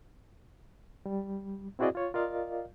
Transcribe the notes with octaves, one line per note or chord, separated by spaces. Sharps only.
G3
C4 E4 F#4 G#4 D5 D#5
F4 C#5
F4 A#4 D5 D#5 F5